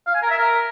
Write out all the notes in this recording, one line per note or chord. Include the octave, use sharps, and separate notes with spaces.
F5
G#5
A#4
E5
A#4